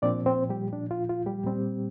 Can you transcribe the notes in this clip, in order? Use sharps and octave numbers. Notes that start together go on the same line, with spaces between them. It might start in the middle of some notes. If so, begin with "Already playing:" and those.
A#2 F3 C4 D4 D5
C4 C5
G3 G4
D4
F4
F4
G3 G4
A#2 G3 C4